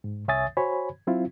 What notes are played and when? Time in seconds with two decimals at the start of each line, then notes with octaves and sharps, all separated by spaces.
0.04 G#2
0.28 C2 C#5 E5 G#5 D#6 A6
0.57 F#4 C5 C#5 G#5 B5
1.07 F#3 C4 E4 F4